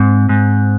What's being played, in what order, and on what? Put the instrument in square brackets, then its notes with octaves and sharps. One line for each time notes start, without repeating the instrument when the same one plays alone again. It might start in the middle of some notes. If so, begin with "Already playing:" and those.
Already playing: [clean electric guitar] G#2 [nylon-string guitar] C4
[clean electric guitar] G#2